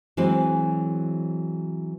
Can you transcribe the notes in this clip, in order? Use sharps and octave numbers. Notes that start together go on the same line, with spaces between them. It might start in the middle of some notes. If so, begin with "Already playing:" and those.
E3 F#3 G#3 C4 E4